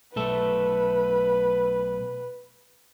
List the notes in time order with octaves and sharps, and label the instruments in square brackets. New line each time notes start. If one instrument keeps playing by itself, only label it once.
[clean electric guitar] B1 A3 A4 [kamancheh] B4